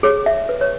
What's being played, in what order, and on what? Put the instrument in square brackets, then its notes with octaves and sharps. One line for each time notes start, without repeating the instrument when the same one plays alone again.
[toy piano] G#4 [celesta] C#5
[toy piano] E5
B4
[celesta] C#5